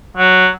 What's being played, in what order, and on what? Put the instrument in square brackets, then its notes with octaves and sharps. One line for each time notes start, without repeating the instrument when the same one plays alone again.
[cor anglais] F#3